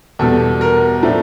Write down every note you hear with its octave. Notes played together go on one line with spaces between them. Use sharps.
E2 B2 G3 A4
A#4
A2 F3 A3 D4